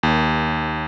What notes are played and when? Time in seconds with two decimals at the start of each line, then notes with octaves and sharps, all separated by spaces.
0.03 D#2